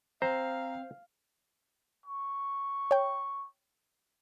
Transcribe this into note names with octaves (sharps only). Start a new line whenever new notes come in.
C4 C5 F5 A#5
C#6
C#5 G5